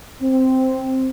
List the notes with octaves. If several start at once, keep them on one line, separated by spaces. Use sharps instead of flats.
C4